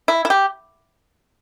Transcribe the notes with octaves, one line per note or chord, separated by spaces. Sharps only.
E4
E4
G4